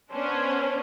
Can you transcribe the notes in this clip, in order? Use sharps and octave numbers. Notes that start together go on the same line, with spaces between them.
B3 C#4 D4 C5